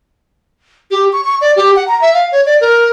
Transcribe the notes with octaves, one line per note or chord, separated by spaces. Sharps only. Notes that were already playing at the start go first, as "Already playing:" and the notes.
G4
C#6
C#6
D5
G4
F#5
A#5
E5
F5
C#5
D5
A#4